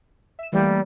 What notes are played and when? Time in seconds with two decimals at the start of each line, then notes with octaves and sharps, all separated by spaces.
0.39 E5 E7
0.53 E3 G3 A3 A#3